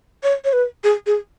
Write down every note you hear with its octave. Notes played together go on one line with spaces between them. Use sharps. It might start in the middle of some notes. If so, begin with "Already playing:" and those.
C#5
C#5
B4
G#4
G#4